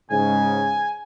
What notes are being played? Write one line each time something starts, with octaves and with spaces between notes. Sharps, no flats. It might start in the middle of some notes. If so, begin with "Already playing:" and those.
G#2 C#3 G#5